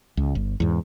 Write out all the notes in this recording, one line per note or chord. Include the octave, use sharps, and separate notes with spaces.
C#2
G1
E2 G#2